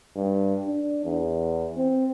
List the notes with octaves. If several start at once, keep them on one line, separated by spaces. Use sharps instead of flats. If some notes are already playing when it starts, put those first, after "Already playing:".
G2
D4
E2
C4